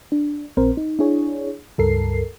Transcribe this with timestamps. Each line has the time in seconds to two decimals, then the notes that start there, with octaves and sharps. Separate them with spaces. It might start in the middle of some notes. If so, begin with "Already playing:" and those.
0.12 D4
0.57 A#1 C4 A#4 C5
0.77 D#4
0.99 D4 E4 G#4 C#5
1.78 C#2 G2 A4 A#4 C7